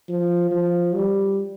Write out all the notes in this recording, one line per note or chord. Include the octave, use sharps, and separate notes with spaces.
F3
F3
G3